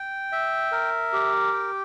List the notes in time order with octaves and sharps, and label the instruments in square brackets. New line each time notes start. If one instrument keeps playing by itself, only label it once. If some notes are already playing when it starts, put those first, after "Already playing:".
Already playing: [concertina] G5
E5
A#4
G4
G5